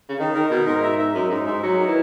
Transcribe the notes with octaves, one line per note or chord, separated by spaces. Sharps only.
C#3
D#3 D#4
D#3 A#4
B2 D#4
G#2 A#4
E5
E5
F#2 D#4
G#2 D#4
G#2 E5
F#3 D#4
A#4
E3